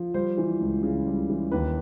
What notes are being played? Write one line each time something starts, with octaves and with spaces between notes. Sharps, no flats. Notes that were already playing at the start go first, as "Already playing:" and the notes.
Already playing: F3
G3 C5
E3
C#2
C#3
G3
E3
D#2 B4